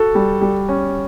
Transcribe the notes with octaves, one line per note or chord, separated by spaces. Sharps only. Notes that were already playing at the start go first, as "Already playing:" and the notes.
Already playing: F#4 A4
G3
G3
C#4